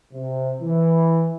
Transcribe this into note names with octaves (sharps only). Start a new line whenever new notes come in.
C3
E3